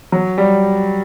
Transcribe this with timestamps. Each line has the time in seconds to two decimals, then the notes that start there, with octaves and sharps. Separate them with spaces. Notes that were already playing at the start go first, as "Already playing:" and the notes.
0.12 F#3
0.38 G3